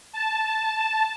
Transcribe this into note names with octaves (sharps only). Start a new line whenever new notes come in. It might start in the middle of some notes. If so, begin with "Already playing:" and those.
A5